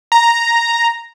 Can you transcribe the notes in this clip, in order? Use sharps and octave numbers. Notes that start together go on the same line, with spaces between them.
A#5